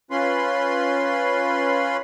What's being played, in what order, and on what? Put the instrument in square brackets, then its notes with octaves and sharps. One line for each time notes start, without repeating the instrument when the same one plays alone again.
[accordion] C#4 F4 B4 B5 C6